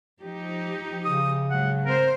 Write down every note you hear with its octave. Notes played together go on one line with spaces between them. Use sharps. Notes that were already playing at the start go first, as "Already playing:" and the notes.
F3 D#4 G4
C#3 D#6
G#2 F#3 F#5
C4 A#4 C5